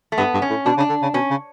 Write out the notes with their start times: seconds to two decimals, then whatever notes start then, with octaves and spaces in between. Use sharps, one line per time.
0.12 A3
0.18 G2 B3
0.34 G2
0.42 C#4
0.50 A2
0.66 B2 D4
0.77 C#3
0.80 D4
0.90 D3
1.02 C#3
1.14 B2 C#4
1.30 C#3